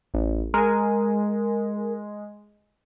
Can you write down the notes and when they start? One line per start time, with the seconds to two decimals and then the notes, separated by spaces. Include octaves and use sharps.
0.14 A1
0.54 G#3 A#4 G#5